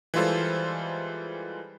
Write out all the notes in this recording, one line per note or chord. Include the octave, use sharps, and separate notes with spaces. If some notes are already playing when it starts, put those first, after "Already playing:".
E3 G3 G#3 F4 A4 C5